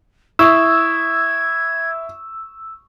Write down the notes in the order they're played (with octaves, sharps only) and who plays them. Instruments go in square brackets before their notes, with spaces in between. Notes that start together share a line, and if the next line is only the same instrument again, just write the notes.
[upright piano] E4 [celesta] C#6 D#6 [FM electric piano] E6 [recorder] G#6